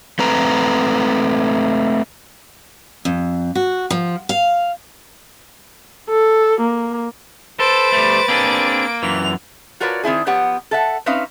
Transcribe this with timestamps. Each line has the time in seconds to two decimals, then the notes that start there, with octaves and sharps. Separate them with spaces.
0.19 A3 C4 B4 A#5
3.05 F2
3.55 F#4
3.90 F3
4.29 F5
6.10 A4
6.61 A#3
7.60 A4 B4 C5 A6 D7
7.92 G3 A3
8.28 A#3 C4 D4 G#4
9.03 F#2 E3 F7
9.80 F4 F#4 A#4 B4 C#5 D5
10.03 D#3 C4 E4 G#4
10.26 F3 B3 G4 C#5 F#5
10.71 A4 E5 F#5
11.06 C4 C#4 D#4 B4 E5 F5